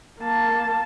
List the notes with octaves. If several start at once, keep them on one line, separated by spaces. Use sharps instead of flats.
A#3 A5